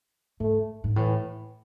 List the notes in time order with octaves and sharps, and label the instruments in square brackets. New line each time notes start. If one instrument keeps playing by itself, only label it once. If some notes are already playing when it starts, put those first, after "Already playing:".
[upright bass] G#2 [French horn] A3
[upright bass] G#2
[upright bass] A2 [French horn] E3